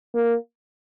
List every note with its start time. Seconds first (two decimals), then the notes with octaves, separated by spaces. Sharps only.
0.14 A#3